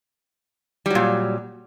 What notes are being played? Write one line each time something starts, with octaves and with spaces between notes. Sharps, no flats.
A#2 F#3 G3